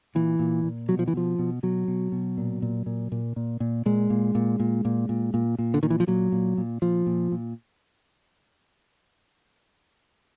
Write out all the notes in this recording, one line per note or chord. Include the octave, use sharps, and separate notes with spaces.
A#2 E3
A#2
A#2
B2 F#3
F3
E3
B2 F3
B2
B2 F#3
B2
B2
A#2
A#2
A#2
A#2
A#2
A#2
A#2 G#3
A#2
A#2
A#2
A#2
A#2
A#2
A#2
D3
A#2 D#3
E3
F3
A#2 F#3
A#2
A#2
A#2 F3
A#2
A#2